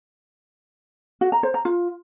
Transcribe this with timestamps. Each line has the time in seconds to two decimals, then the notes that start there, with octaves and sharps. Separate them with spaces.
1.21 F#4
1.32 A#5
1.43 C5
1.54 A#5
1.65 F4